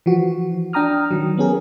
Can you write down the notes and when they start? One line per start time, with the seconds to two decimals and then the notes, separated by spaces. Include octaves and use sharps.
0.06 E3 F3 F#4
0.73 D4 G5 A#5 D#6 F6
1.11 D#3 F#3
1.38 B3 C#4 G#4 A#4